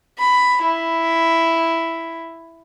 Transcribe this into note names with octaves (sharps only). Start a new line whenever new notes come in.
B5
E4